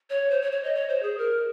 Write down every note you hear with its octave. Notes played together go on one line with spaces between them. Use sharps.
C#5
C5
C#5
C#5
D#5
C#5
C5
G#4
A#4